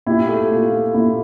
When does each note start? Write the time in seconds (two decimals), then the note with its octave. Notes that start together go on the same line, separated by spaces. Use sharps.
0.06 A#2 E4 G4
0.29 A3
0.50 A#2 F4
0.72 A3
0.94 A#2 E4